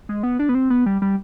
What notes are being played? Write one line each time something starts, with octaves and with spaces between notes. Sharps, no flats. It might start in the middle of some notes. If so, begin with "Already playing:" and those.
G#3
B3
D4
B3
C4
B3
G3
G3